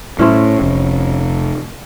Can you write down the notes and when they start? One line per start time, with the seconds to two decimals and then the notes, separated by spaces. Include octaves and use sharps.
0.19 A2 C#4 E4 C5
0.61 F1